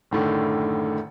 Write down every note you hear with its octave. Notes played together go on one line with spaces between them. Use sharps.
F#1 A2 D3 D#3